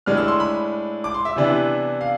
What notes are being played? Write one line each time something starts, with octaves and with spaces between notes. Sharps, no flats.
A2 G#3 D4 F6
E6
C6
B5
D6
C6
E5
C3 E3 B3 D4
F5